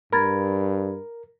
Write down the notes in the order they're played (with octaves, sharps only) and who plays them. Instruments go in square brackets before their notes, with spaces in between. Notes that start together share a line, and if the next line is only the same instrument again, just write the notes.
[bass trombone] G2 [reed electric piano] A#4 [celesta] B5 G#6 A6